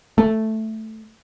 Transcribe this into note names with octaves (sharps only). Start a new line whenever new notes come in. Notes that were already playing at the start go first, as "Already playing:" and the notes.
A3